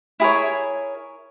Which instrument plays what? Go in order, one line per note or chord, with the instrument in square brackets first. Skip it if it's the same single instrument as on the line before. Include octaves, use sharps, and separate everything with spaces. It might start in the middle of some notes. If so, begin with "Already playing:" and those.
[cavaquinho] E4 G#4 A#4 C#5